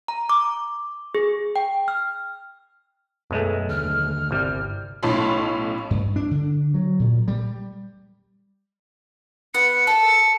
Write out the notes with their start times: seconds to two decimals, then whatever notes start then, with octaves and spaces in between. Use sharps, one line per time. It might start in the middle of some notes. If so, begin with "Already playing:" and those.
0.08 A#5
0.29 D6
1.15 G#4
1.56 G5
1.88 F6
3.31 B1 F#2 G#3 A3
3.69 D#2 D3 F6
4.31 G1 C2 G3
5.03 B1 A2 C#4 A5 B5 C6
5.91 G2
6.16 D4
6.31 D3
6.74 F#3
7.00 A#2
7.28 G3
9.54 B3 F#5 C#7
9.87 A4 C#7